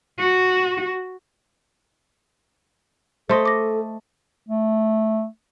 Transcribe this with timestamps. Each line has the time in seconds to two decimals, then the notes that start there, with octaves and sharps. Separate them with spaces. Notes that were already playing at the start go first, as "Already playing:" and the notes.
0.19 F#4
3.29 A3 A4 C5 D#5 C6
3.46 D6 A#6
4.49 A3